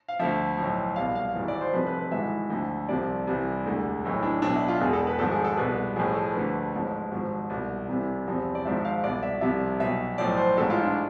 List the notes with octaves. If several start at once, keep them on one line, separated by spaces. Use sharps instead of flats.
F5
D2 D3 F3 E5
B1 A2 F3
C2 B2 F5
F5
G#1 G#2 E3
D5
C5
F1 F2 C3 F3 B4
B4
B4
G#1 G#2 E3 E5
D2 D3 F3
C2 C3 F3 D5
C2 C3 E3
E1 D2 D3
B1 A2 E3
D4
B1 B2 D4
E4
F4
E1 E2 B2 G#4
A4
B4
G#1 G#2 F3 A4
G#4
A4
C2 B2 B4
A1 A2 F3 G#4
A4
D2 D3 F3 B4
A1 G#2 F3
G#1 G#2 F3
C2 B2
C2 C3 E3
E2 C3 F3
D5
G#1 G#2 F3 E5
F5
C2 B2 D5
E5
C2 C3 F3 E5
B1 B2 E5
B1 A2 F3 D5
C5
A1 G#2 E3 A4
F4
D4